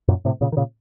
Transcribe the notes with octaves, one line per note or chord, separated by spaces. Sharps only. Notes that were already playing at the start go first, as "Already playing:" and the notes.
F#2 A#2
A2 C3
A#2 C#3
D#3
A#2 C#3